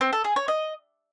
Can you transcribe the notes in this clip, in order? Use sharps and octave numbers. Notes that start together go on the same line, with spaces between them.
C4
A4
G#4
C#5
D#5